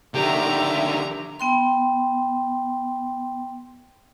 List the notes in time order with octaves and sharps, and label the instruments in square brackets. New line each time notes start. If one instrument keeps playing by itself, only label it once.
[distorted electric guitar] D3 D#3 [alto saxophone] G4 [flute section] E5 [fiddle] A#5
[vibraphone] B3 G5 C6